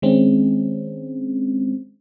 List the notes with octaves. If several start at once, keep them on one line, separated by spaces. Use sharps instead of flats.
D#3 G#3 C4 C#4